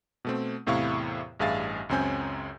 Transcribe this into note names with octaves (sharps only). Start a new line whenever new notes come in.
B2 A3 C4
E2 A2 C3 E4 F5 C#6
A1 G2 G#4 E5 F5 A6
C#2 F#2 C4 C#4 G#5 G6